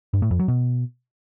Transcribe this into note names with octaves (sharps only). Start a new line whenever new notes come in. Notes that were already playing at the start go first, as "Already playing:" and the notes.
G2
A2
F2
F#3
B2